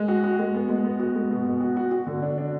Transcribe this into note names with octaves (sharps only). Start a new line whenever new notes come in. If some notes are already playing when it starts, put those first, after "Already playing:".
Already playing: G#3
F#4
F#4
G#3
B3
G#3
B3
F#4
G#3
B2
B2
F#4
F#4
F#4
D3
D4
D4